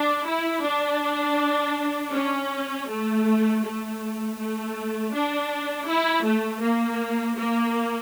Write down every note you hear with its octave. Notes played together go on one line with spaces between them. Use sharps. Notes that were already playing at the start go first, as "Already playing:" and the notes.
Already playing: D4
E4
D4
C#4
A3
A3
A3
D4
E4
A3
A#3
A#3